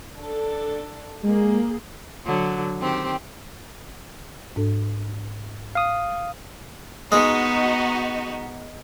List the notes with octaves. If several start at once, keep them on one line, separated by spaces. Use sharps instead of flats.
D4 A4
G#3 A#3 G#4
D3 F#3
D#3 C4 G4
G#2 D4 A4
F5 D#6
G#3 B3 D#4 F#4